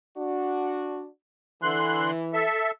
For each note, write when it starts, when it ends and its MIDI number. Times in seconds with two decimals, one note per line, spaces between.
0.17 1.06 62
0.17 1.06 66
1.62 2.11 50
1.62 2.45 52
1.62 2.11 84
1.62 2.11 90
2.33 2.71 69
2.33 2.71 76